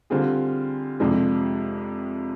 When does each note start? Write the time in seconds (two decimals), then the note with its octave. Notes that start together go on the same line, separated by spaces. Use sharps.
0.10 D3 G3 C4 F4 G#4
1.00 F2 C3 F3 G#3 D4